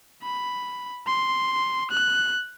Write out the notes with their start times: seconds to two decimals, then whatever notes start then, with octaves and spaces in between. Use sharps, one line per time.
0.23 B5
1.06 C6
1.91 F#6